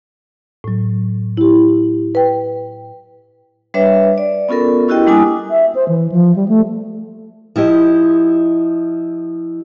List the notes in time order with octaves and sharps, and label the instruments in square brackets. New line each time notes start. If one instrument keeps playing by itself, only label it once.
[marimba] A2 F#3
E4 G4
B4 G5
[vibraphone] G3 D4 B4 C#5 E5
D5
B3 C#4 F4 A4 A#4
C#4 E4 F#4 G4 D#5 G5
G3 A#3 D4 E4 G#5 D#6
[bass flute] E5
C5
E3
F3
G3
A3
[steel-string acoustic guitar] F3 E4 G4 D#5